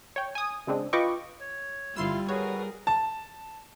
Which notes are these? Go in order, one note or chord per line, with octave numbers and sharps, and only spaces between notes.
C#5 G5
G#5 D#6
C#3 G#3 C4 D4
F4 B4 D#5 G5 C#6 D6
C#5
G1 G3 E4 F4 C6 E6
F#4 G#4 A#4 B4 C#5
A5